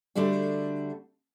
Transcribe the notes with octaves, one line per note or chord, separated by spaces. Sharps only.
D3 G3 A3 D4 F#4